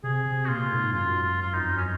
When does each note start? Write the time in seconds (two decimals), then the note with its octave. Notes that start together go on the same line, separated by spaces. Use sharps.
0.04 C3 G#4
0.26 C3
0.45 F#4
0.49 A#2 F4
0.66 A#2
0.71 G#2
0.93 F#2 F4
1.23 F4
1.41 F4
1.54 D#4
1.60 F2
1.71 F#2
1.77 C#4